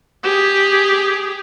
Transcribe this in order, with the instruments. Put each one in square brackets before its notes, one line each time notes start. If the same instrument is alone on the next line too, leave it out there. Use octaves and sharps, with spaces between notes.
[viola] G4 G#4